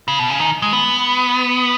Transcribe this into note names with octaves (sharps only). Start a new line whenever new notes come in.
C#3
B2
C#3
D#3
G#3
B3